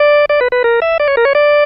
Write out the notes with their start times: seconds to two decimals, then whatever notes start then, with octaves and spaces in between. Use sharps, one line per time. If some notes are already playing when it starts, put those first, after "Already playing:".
Already playing: D5
0.29 D5
0.41 B4
0.52 B4
0.64 A#4
0.82 E5
1.00 D5
1.08 C#5
1.17 A#4
1.25 C#5
1.35 D5